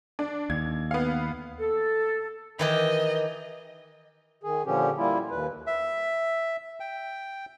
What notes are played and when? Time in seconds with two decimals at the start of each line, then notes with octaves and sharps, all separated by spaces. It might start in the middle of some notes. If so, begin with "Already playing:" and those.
0.19 D4
0.50 D#2 G#6
0.91 B3 F5
1.59 A4
2.59 D#3 E3 G4 D#5
4.44 D#3 G#4
4.66 A#2 D3 F3 C#4 G4
4.98 G3 A#3 E4 F4
5.31 D#2 B4
5.67 E5
6.80 G5